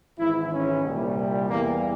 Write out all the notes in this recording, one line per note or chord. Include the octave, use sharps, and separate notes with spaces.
G#1 G#2 E3 E4
C#4
C2 A#2 G3
E2 E3 G3 A#3